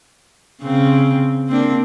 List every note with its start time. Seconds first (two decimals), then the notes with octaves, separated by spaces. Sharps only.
0.62 C#3 C4
1.47 A#3 C4 D4